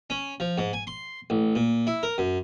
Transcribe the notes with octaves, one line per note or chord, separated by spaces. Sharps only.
C#4
F3
G#2
G#5
C6
A1
A#2
E4
A#4
F#2